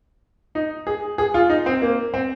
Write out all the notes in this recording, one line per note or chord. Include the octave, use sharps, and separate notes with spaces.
D#4
G#4
G#4
F4
D#4
C4
A#3
C4